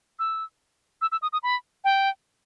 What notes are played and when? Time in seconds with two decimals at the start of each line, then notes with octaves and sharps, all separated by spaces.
0.19 E6
1.02 E6
1.12 E6
1.22 D#6
1.33 D#6
1.43 B5
1.84 G5